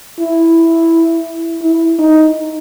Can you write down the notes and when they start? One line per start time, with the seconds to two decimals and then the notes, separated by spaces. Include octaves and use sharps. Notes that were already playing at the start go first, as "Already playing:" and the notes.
0.19 E4
1.63 E4
1.99 D#4